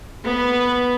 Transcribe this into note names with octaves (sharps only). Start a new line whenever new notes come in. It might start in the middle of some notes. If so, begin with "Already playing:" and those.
B3 B4